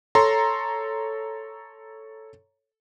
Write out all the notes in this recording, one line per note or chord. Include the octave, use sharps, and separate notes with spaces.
A4 C#5 A#5 C6